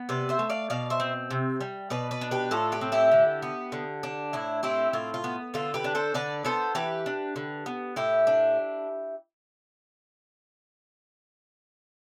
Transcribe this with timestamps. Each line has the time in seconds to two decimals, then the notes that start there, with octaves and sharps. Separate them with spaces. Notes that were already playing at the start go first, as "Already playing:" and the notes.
Already playing: B3
0.09 C3 B4 D5
0.29 C5 E5
0.39 A3
0.50 D5 F5
0.70 B2 D5 F5
0.90 C5 E5
1.00 C4
1.30 C3
1.61 G3
1.90 B2 B4 D5
2.11 B4 D5
2.21 D4
2.31 G4 B4
2.51 A2 F4 A4
2.72 G4 B4
2.81 C4
2.92 E4 G4
3.12 D3
3.42 B3
3.72 D3
4.03 D4
4.33 A2 E4
4.63 C4 E4 G4
4.93 A2 F4
5.14 F4
5.24 B3
5.54 D3 F4 A4
5.74 G4 B4
5.84 D4
5.95 A4 C5
6.14 D3 B4 D5
6.45 B3 A4 C5
6.75 E3 G4 B4
7.06 D4
7.36 D3
7.66 B3
7.96 A2 E4 G4
8.27 D4